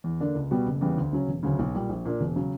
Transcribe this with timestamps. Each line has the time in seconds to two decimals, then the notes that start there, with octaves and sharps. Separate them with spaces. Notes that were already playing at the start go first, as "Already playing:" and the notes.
0.04 E2
0.20 D3 A#3 D4
0.35 C#2
0.51 B2 G3 B3 F#4
0.67 F#1
0.81 E2 C#3 G3 B3
0.98 D2
1.13 C#3 F#3 C#4
1.28 E1
1.43 D2 C#3 F#3 C#4
1.59 B1
1.74 A#2 G3
1.89 A#1
2.05 A#2 A#3 D4
2.21 E1
2.36 C#3 F#3